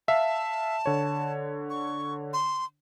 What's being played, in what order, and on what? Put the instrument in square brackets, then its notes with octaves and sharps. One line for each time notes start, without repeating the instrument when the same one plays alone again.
[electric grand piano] E5 F5 [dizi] A5
[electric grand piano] D3 C#5
[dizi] C#6
C6